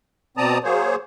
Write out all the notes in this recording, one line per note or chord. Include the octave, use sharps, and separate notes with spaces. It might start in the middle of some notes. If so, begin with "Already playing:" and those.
B2 C4 D5 A5 A#5 D#6
F#3 A#3 G#4 C5 C#5